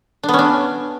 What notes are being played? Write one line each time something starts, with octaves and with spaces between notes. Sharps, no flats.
D4
B3
C#4
D4